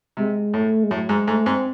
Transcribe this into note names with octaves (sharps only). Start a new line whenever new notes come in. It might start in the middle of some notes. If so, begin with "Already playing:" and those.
C3 G#3
A2 A3
G#3
A2 F#3
G#2 G#3
G#2 A3
G#2 C4